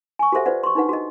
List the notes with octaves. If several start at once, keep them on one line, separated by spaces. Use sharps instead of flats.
G#5 C#6
F#4 G4 A4 C5 E5 F#5
F4 B4 C5 D5 F#5
C6 C#6
D4 D#4 B4 F#5
F#4 G#4 D#5